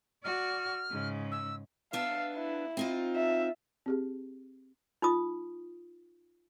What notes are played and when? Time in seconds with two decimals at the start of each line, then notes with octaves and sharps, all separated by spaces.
0.24 F#4 D5 F6
0.90 G#2 C#3
1.31 E6
1.93 B3 D4 E5 F5
2.35 E4
2.77 C4 D#4 F4
3.16 E5
3.86 C4 G4 G#4
5.02 D#4 F4 D#6